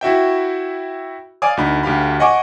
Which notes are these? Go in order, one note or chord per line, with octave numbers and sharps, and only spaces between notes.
E4 F#4 E5 G5
D5 F5 G#5 D6 D#6
D2 D#4 B5
D2 G4 F5 B5
D#5 F#5 G#5 C#6 D6